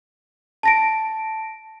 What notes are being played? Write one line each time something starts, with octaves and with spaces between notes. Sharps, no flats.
A5 A#6 D7